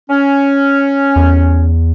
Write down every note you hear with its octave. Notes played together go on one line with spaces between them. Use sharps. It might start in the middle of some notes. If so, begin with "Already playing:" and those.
C#4
E2